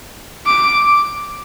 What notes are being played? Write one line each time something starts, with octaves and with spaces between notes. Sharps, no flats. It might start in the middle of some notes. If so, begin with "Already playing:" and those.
D6